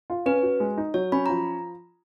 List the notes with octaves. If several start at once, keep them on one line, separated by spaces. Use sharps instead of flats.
F4
C#4 B4
F#4
G#3
D#4
F#3 C#5
C#4 B5
F3 A#5